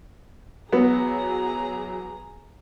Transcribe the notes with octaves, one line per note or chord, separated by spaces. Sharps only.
E2 F#3 B3 G#4 A#5